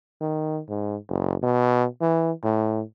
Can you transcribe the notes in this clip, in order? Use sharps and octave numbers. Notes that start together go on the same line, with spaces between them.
D#3
G#2
F#1
B2
E3
A2